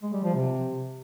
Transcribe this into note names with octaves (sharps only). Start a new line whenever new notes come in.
G#3
G3
F3
C3